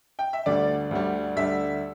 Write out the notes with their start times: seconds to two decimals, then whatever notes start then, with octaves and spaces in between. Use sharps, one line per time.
0.19 G5
0.33 E5
0.46 D2 D3 G3 D5
0.91 D2 D3 G3
1.36 D2 D3 G3 E5